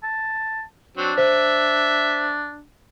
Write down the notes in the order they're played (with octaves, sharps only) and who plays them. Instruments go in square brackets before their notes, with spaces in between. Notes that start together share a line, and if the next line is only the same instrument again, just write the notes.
[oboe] A5
[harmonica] F#3 C4 [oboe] D4
[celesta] C5 [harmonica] E5